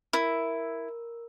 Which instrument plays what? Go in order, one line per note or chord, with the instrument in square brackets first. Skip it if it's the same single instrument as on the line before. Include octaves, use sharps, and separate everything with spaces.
[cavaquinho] E4 [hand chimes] A#4